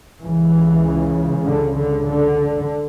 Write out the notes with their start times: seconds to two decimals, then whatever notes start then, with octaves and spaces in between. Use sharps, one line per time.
0.22 C#2 C#3 E3
1.46 D3
1.78 D3
2.07 D3